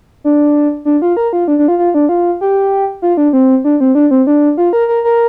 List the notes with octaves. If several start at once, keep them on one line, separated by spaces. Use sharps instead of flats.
D4
D4
F4
A#4
F4
D4
D4
F4
F4
D4
F4
G4
F4
D4
C4
D4
C4
D4
C4
D4
F4
A#4
A#4
A#4